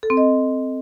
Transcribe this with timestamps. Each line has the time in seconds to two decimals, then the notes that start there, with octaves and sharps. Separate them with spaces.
0.03 A4
0.10 C4
0.17 D#5